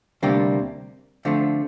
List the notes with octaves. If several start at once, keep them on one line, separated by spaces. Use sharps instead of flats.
D2 C3 G3 A#3 D4
D3 F3 A3 C4